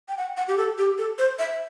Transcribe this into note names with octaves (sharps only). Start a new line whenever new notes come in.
G5
F#5
F#5
G4
A4
G4
A4
C5
E5